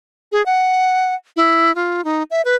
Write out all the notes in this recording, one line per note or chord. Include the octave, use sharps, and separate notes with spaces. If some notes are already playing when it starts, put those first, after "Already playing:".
G#4
F#5
E4
F4
D#4
E5
B4